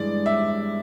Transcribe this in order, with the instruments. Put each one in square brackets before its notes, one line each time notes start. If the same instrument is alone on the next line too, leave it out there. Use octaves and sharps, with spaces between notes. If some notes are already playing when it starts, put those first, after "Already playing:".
Already playing: [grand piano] G2 E3 G#3 [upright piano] D5
[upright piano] E5